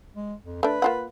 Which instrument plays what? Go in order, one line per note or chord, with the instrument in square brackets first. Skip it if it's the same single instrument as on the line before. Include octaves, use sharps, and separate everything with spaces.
[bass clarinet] G#3
F2
[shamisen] A3 D4 [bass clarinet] B4
[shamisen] A#3 F4 F#5